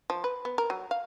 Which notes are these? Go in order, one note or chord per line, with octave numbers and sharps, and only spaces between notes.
F3
B4
B3
A#4
F#3
F5